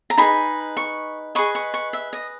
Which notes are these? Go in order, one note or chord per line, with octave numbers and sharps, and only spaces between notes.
A#5
D#4 G#4 B4 B5
C#6
G#4 B4 D#5 C#6
C#6
C#6
E5
D#5